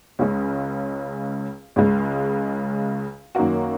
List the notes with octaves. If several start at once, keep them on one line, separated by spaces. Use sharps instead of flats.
C#2 C#3 G#3 C#4
C#2 C#3 G#3
F#2 D#3 A#3 F#4